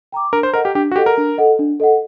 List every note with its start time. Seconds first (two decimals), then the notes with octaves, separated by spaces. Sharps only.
0.12 G5 A#5 D6
0.32 D4 A#4
0.43 C5
0.54 A4 A#4 D#5 F#5
0.65 G4
0.75 D4 G4
0.91 F#4
0.96 G4 A4 D#5 F#5
1.06 A#4
1.18 D4
1.38 A4 D#5 F#5
1.59 D4
1.80 A4 D#5 F#5